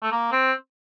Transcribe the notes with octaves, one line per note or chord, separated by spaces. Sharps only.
A3
A#3
C4